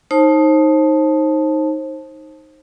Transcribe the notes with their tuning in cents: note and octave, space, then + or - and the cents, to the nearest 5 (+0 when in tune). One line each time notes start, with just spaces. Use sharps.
D#4 +5 C5 +30 A5 -5